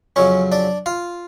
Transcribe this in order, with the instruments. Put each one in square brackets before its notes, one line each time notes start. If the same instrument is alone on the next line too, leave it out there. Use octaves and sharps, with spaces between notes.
[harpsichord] F2 C#3 F#3 C#4 C#5
D4 D5
F4 F5